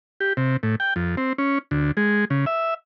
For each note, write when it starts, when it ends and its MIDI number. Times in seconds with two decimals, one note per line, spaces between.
0.20 0.33 67
0.37 0.57 48
0.63 0.76 45
0.80 0.94 79
0.96 1.16 41
1.17 1.33 60
1.38 1.58 61
1.71 1.92 38
1.97 2.25 56
2.30 2.45 49
2.46 2.74 76